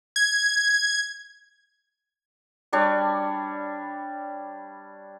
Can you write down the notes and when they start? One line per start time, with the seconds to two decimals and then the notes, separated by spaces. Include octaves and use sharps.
0.16 G#6
2.73 G3 D4 C#5 D5